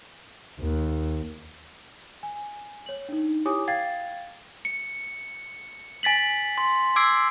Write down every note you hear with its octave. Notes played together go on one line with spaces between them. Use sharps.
D#2
G#5
C#5 F#7
D4 D#4
E4 G4 C#5 G#5 D6 D#6
F5 G5 G#6 A6 C7
C#7
G#5 A6 B6 F#7
C6
D6 E6 G#6 C7 D7